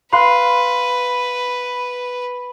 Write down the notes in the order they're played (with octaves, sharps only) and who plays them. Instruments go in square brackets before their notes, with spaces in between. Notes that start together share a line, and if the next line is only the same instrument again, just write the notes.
[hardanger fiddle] B4 [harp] F5 C6 F#6 [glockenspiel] B5